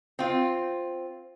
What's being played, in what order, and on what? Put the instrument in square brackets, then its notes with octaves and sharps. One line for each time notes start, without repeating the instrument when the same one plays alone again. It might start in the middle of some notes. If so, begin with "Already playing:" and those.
[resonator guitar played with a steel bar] C4 F4